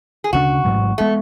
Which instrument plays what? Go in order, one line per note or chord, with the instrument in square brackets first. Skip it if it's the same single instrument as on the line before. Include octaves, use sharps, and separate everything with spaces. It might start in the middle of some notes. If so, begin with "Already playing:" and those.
[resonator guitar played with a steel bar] G#4
[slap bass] D2 C#3 G#3 D4 [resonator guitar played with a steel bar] F#4
[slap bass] A1 G#2 F#3
[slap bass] G#3 B3 [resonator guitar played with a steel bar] A3